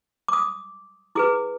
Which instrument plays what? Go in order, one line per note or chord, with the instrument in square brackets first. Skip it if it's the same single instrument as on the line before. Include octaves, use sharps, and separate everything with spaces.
[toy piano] D6
D#6
E4 G#4 B4 D6